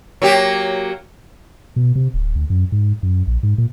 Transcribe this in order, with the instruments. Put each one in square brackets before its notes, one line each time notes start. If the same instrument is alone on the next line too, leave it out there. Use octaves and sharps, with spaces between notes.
[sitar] F#3 A#3 G4
[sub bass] B2
C3
D1
D2
F#2
G#2
F#2
A#1
G#2
A#2